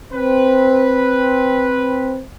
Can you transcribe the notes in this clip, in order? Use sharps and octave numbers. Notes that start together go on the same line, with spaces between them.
C4 B4